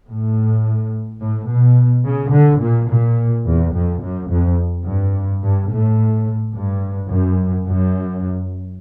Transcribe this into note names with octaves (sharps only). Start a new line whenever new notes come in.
A2
A2
B2
C#3
D3
A#2
A#2
E2
F2
F#2
F2
G2
G2
A2
G2
F#2
F#2